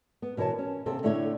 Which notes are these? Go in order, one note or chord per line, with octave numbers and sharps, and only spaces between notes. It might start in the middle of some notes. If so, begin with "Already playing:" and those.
B3
B2 E3 A#4 C#5 A5
C#4
D#2 C3 C4 A4
A2 D3 A3 E4 C#5